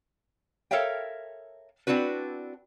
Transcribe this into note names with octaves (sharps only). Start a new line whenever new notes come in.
A4 A#4 C#5 E5 F5 G5
C4 D4 E4 F#4 B4